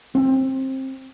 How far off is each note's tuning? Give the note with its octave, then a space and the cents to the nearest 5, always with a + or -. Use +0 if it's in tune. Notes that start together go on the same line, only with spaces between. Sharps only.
C4 +20